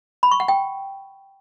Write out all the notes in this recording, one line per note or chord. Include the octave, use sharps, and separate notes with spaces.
B5
C#6
F#5
G5